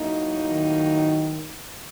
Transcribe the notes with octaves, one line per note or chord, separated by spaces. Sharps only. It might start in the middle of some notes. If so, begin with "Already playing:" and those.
Already playing: A2 F#3 A#3 D#4
D#3